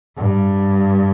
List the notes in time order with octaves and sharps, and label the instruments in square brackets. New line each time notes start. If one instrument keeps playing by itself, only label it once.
[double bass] G2